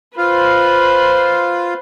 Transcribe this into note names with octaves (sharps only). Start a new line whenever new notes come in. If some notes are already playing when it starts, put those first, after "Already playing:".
F4 B4 C5 F5